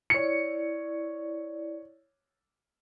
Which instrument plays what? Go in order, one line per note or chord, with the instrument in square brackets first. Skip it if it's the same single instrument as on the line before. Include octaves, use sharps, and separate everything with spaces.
[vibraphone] E4 D5 [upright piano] C#5 C#7